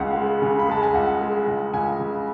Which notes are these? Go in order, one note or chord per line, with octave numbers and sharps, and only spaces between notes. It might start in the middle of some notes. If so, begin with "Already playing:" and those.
Already playing: C#2 C#3 G#3 F5 F#5
G#3
C#3
B5
G#3 A5
G#5
C#2 F#5
G#3
C#2
C#2 G#5
C#3